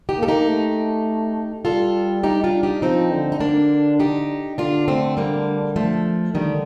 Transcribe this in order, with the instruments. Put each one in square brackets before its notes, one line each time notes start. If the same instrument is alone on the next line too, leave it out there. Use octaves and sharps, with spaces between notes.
[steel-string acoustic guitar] D#4 G4
[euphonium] A#3 [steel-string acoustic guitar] A4
[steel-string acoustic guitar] D#4 G4
[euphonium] A3
[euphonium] G3 [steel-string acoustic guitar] F4 A4
[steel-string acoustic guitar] D#4 G4
D4 F4
D#4 G4
[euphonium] F3 [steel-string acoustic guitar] C4 D#4
[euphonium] D3
[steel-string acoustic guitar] D#4
A#3 D4
D#4 G4
[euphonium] D3 [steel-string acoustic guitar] D4 F4
[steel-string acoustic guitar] A3 C4
G3 A#3
F3 A3
[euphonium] D3 [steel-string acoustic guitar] D#3 G3